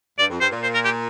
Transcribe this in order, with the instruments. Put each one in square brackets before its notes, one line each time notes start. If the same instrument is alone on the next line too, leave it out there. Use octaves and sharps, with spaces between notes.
[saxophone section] G2 [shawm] D5
[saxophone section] F2
[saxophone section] G2 [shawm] C5
[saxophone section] A#2
[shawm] C5
A#4
G4